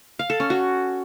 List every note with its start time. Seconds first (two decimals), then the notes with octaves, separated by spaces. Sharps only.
0.19 F5
0.30 A4
0.40 C#4
0.50 F#4